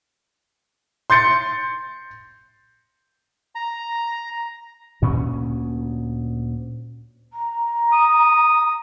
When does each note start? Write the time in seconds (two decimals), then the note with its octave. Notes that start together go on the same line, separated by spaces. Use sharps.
1.10 C6 G6 A6 C#7
3.55 A#5
5.02 D2 A#2 C#4
7.33 A#5
7.92 D#6